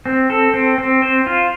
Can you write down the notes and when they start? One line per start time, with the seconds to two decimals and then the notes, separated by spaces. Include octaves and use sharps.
0.06 C4
0.30 A4
0.54 C4
0.78 C4
1.02 C5
1.26 F4